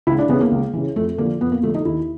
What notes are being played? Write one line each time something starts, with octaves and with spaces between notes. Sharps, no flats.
C#2 E4
D4
C#3 E3 B3
A#3
C#2
C#3 E3
F2 A3
D3 F3 A#3
F2 B3
A#3
D3 F3 A3
D#4
D#2 E4